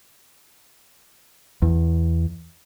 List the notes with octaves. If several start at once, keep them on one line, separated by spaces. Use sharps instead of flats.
E2